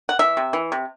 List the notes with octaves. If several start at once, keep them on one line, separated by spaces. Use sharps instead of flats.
F#5
E3 E5
C3
E3
C3